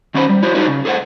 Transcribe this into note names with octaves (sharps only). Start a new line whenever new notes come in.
D#3 C#4 F#4 B4 C5
G3
E4 F#4 C5
D4 D#4 F#4 G#4 B4 C#5
C#3
G#4 A4 C5 F#5